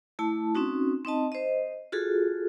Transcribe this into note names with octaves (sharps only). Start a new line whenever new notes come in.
A3 E4 A5
C4 C#4 D#4 F#4
C4 D#4 D#5 A5
C5 D#5
F4 F#4 G#4 A4